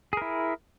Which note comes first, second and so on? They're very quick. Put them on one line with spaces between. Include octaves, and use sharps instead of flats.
G#4 A#4 E4